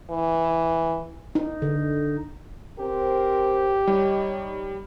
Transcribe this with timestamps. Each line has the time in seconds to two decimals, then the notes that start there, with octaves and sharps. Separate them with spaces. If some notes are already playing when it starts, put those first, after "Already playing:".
0.10 E3
1.35 D#4
1.62 D3
2.79 C4 G4 A#4 C5
3.87 G3 D#4 C#5